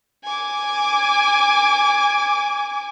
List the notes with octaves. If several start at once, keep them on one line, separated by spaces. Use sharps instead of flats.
G#5 D6